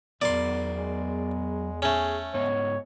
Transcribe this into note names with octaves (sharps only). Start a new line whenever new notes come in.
E2 F#3 B3 A#4 D5 C6
G#3
A3 C#4 G#4
G#2 B3 C#5 D#5